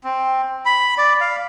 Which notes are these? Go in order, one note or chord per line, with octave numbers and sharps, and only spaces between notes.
C4
B5
D5
F5